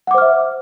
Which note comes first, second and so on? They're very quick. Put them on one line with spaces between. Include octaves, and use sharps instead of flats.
F#5 D6 C5 F6 E5